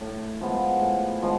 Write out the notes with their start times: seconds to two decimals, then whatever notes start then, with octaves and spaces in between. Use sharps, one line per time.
0.01 A2
0.41 F3 G#3 B3
0.81 A2
1.22 F3 G#3 B3